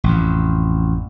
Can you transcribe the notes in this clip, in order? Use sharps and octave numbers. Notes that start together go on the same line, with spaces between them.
A1 F2